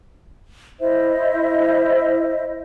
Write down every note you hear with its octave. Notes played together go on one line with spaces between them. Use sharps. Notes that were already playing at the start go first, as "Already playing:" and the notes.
E4 C5 D#5 E5